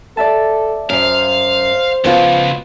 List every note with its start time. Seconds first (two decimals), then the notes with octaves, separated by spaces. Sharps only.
0.17 A4 D5 E5 A5
0.90 F#2 C5 F5
2.04 C#2 F3 B3 F4